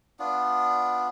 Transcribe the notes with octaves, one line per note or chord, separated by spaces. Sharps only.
B3 D4 F4